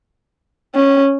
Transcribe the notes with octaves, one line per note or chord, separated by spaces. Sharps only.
C#4